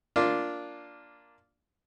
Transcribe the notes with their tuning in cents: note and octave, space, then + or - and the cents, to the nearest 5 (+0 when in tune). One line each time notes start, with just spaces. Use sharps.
A#3 +0 D4 -5 F4 +0